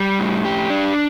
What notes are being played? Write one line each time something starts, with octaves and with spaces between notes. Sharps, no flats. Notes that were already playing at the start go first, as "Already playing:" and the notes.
Already playing: G3
A2
G4
D4